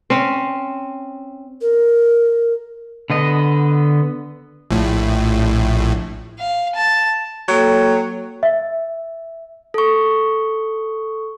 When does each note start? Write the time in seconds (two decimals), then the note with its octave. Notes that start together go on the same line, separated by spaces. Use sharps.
0.10 C4 C#4
1.61 A#4
3.10 D3 B3 D#5
4.71 A#1 A2
6.39 F5
6.75 A5
7.48 F#3 A#3 A4 G5
8.43 E5
9.74 A4 C#6